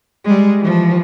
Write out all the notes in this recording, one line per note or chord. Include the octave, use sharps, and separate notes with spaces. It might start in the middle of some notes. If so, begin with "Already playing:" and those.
G3 G#3
E3 F3